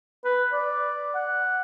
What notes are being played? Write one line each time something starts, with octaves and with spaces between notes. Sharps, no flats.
B4
D5
F#5